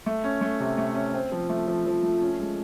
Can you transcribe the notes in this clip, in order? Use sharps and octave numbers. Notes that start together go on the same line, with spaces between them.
A3
C#4
A3
C3
A3
C#4
C4
F3
A3
F3
F3
A3
C#4
G#3